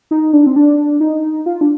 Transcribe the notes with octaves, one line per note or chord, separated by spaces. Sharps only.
D#4
D4
C4
D4
D#4
F4
D4